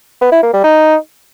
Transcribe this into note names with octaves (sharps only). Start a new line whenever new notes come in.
B3
E4
A#3
G3
D#4